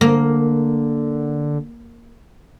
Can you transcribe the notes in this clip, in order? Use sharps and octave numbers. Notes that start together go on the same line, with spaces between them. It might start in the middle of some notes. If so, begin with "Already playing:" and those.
D3 A#3